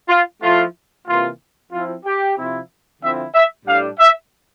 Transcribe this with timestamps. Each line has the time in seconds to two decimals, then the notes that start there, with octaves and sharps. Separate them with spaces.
0.09 F4
0.41 F3 A3 E4 F4
1.06 C3 E3 A#3 F4
1.71 F3 C4 E4 F4
2.03 G4
2.36 C3 F3 C4 E4
3.01 D3 F3 C4 E4 E5
3.33 E5
3.66 A2 G3 D4 F5
3.98 E5